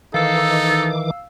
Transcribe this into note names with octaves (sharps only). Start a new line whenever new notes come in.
D#3 E3 D#4 A4 F5 D6 E6